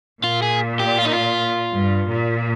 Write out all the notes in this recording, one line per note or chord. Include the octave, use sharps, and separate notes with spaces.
A#2 F4
G#4
G4
F4
D#4
F4
G2
A#2